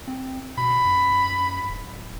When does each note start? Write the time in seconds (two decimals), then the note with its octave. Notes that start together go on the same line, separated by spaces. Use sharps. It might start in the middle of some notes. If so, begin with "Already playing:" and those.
0.08 C4
0.58 B2 B5
0.85 F#2
1.70 D1